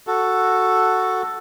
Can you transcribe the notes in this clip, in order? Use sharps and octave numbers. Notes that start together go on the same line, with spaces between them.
F#4 A4